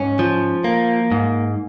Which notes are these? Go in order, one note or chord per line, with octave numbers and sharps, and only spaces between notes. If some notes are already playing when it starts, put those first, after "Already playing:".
Already playing: G#2 C#4
F3
A#3
G#2